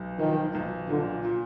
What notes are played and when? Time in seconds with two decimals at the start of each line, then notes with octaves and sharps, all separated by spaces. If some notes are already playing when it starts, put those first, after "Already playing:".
Already playing: B1
0.19 D#3 F3
0.55 B1
0.89 A#2 D3
1.25 A#2